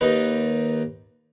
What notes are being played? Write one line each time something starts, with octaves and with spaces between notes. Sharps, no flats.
D#2 D#4 B4